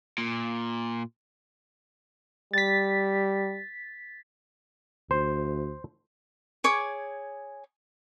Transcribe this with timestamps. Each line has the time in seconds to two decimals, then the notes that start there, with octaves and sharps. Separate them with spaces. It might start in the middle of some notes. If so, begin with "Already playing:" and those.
0.18 A#2
2.54 G3 A6 B6
5.11 D2 C5
6.64 G#4 C#5 D6